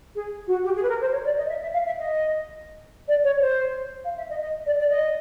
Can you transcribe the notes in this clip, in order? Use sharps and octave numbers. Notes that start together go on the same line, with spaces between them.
G#4
F#4
G4
G#4
B4
A#4
C5
C#5
D5
D#5
E5
E5
F5
E5
D#5
D5
C#5
C5
F5
E5
D#5
D#5
D5
D5
D#5